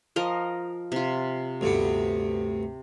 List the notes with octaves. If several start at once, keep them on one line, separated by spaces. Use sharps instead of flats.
F3 A#4 D#5
C3 F4
D2 G2 B3